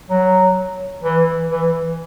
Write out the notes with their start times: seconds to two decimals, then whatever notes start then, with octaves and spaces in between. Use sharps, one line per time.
0.09 F#3
1.03 E3
1.50 E3